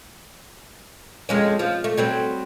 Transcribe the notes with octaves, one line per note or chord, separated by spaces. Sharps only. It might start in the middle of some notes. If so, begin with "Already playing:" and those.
F2 G#3 C#4
F3
A3
F#3 G3 C4